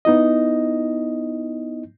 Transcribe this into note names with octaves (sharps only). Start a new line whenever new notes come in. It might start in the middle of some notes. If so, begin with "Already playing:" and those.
B3 D#4 E4 D#5